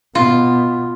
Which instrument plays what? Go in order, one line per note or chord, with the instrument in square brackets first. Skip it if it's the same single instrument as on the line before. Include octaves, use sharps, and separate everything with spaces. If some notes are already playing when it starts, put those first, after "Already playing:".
[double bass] B2 [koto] F4